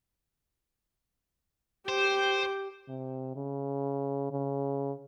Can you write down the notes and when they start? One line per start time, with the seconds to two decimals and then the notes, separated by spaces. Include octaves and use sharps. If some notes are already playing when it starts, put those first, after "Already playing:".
1.89 G4 C5 G5
2.88 C3
3.36 C#3
4.31 C#3